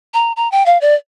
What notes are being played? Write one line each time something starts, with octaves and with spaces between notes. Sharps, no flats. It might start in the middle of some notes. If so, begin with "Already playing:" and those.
A#5
A#5
G5
F5
D5